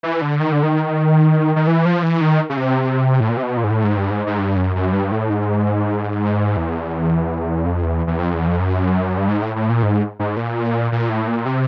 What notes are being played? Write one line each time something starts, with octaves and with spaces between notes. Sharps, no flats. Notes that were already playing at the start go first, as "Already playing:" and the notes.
E3
D3
D#3
D3
D#3
D#3
E3
F3
E3
D#3
C#3
C3
A2
A#2
C3
B2
A#2
G#2
A2
G#2
G2
G#2
G#2
G2
F#2
F#2
G2
A2
G#2
E2
F2
E2
E2
F2
E2
F2
F#2
G2
G#2
A2
A2
A#2
G#2
G#2
A#2
A#2
A2
A#2
C3